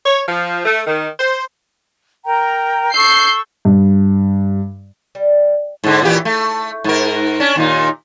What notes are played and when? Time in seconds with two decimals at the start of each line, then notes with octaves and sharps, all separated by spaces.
0.06 C#5
0.29 F3
0.66 A3
0.87 D#3
1.20 C5
2.25 A#4 G5 A#5
2.93 A4 C#6 E6 G6 C7
3.65 G2
5.15 G3
5.84 G#2 D3
6.02 A#2 E3 G4
6.25 A3
6.84 G#2 A#4
7.40 C#4 D4
7.56 D#2 A#2 D#4